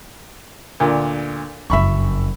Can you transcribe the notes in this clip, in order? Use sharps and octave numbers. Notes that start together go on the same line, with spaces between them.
D2 A#2
F#1 F2 E5 B5 C#6